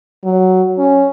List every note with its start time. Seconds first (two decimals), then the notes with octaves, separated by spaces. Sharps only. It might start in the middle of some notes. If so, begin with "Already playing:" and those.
0.24 F#3
0.78 C#4